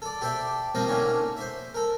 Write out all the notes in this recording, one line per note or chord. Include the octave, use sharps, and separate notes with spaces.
A4 D5
G4 A4 C5 D5 E5
F3 G3 A#3 C4 C5 D#5
A2 D3 A#3 C#4 D#4
C5 E5
A4 A#4